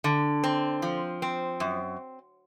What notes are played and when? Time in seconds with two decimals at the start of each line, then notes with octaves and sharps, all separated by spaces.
0.04 D3
0.44 C4
0.82 F3
1.22 C4
1.60 F#2